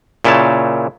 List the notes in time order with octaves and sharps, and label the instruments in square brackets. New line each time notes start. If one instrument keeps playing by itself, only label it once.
[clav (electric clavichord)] A#2 C#3 E4 C#5 A5